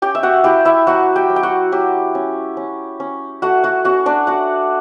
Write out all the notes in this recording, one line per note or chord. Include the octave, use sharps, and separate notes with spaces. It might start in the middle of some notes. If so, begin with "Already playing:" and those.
C#4 G4 G5
E5
F#4 F#5
E4 G4 G5
E4 E5
F#3 F#4 F#5
G4 G5
F#3
G5
F#4 F#5
F#3 G4
C#4
C#4
C#4
A3 F#4 F#5
F#4 F#5
C#4 F#4 F#5
D4 D5
A3 F#4 F#5